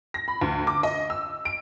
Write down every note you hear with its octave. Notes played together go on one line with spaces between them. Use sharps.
A#6
B5
D2
D6
D#5
E6
D7